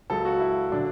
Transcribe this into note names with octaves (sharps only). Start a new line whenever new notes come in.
C#2 C#3 F#3 A4
F#4
E4
D3 F#3 D4